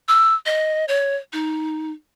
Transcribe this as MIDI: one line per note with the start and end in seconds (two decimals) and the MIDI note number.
0.08 0.35 88
0.46 0.85 75
0.88 1.16 73
1.33 1.91 63